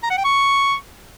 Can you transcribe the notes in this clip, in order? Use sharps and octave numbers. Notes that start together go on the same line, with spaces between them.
A#5
F#5
G5
C#6